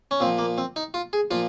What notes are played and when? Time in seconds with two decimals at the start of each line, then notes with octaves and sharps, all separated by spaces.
0.11 C#4
0.20 A#2 F3 C4
0.38 A#3
0.58 C4
0.76 D#4
0.94 F4
1.13 G#4
1.31 A#2 F3 F4